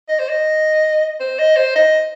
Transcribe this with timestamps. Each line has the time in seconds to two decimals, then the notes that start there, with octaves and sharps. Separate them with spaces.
0.09 D#5
0.19 C5
0.29 D#5
1.20 C5
1.39 D#5
1.56 C5
1.76 D#5